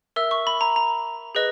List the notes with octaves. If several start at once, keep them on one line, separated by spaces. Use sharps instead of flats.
A#4 E5 E6
C#6
B5
A#5
A#5
G#4 B4 D#5